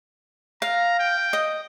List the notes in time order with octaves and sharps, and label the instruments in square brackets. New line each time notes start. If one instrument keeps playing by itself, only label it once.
[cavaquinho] F5 [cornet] A#5
[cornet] G5
[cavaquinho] D#5